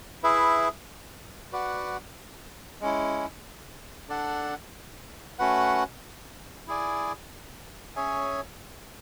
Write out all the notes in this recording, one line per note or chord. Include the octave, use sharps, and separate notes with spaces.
E4 G#4 B4 E5
F#4 B4 D5 F#5
G#3 C#4 E4
D4 A4 D5 F#5
A3 C#4 F#4 B4 F#5
E4 G#4 D5 G#5
C#4 G#4 C#5 E5 G#5